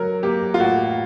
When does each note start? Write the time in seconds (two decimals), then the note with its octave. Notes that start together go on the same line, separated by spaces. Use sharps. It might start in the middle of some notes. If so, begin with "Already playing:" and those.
Already playing: F#3 A#4
0.23 A#3 G4
0.54 F4
0.59 A2 F#4